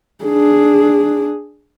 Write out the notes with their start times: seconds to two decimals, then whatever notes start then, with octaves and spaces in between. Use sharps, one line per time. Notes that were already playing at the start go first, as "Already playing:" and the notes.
0.25 D4 G#4